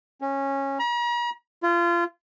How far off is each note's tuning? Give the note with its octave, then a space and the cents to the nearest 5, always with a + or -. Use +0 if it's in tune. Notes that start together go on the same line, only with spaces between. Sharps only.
C#4 -15
A#5 +45
F4 -25